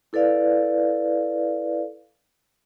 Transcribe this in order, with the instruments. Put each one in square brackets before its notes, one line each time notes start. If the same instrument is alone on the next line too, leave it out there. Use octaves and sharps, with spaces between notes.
[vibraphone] E4 A4 B4 D5 F5